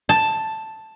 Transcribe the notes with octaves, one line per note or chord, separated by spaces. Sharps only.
A5